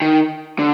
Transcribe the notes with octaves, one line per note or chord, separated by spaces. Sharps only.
D#3
D3